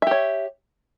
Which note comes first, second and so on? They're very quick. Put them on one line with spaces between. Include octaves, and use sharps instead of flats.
E5 G4 C#5